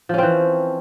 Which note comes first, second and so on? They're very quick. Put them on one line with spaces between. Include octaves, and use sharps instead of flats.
F3 C#4 C4 E3